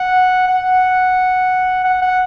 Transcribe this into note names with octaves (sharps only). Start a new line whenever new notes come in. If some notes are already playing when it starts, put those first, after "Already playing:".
Already playing: F#5
F#5
F#5
F#5